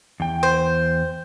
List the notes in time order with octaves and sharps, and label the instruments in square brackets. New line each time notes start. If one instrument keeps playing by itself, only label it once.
[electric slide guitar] E2 G5
[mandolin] C5